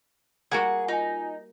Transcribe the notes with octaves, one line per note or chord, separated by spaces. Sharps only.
G3 A#3 F#4 G#4 F#5
D#4 F4 G#5